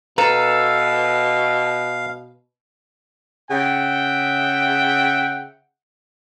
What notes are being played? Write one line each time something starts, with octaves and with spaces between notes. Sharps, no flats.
B2 A4 B4 F5 A#5
C#3 E5 F#5 G5